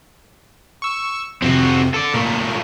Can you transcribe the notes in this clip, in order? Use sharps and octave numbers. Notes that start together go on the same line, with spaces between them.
C#6 E6
F2 C3 C4 F#4
A4 D5
A#2 A3 A#4